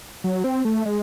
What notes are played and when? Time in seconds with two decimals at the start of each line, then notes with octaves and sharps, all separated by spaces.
0.24 F#3
0.44 C4
0.65 A3
0.86 G#3